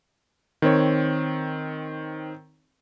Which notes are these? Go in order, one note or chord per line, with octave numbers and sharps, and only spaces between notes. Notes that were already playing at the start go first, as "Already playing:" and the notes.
D#3 C4 C#5